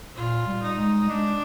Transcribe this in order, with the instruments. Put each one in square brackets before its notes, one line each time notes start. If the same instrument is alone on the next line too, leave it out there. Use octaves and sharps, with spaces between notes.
[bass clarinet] A#2 [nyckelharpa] F4
[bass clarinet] G3
[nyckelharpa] D#4
[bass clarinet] G#3
[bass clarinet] G#3 [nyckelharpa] D4